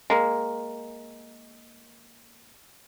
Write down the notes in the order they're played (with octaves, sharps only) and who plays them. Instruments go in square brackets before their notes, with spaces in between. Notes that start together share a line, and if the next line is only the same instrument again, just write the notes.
[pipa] G#3 A#3